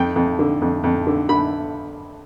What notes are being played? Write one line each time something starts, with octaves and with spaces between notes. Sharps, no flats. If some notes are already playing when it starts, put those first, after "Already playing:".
Already playing: F2 G5
F2
D3
F2
F2
D3
D3 B5